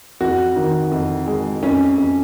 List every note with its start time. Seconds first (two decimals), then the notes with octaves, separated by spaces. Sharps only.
0.20 F2 F#4
0.56 D#3
0.91 F2
1.27 G#3
1.62 F2 C#4
1.98 F2